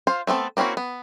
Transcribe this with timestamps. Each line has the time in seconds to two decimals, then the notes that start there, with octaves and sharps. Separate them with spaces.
0.07 F4 C5 F5
0.27 A3 B3 C4 A4
0.57 A#3 C4 C#4 E4 F#4
0.77 B3